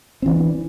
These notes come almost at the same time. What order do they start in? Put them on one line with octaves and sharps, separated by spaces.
C4 E3 D4